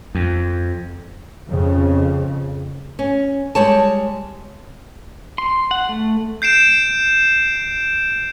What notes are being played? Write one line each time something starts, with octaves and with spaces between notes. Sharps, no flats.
F2
F2 C#3
C#4
G3 G#3 C#5 A5
C6
F#5
A3
G6 C7 D7 E7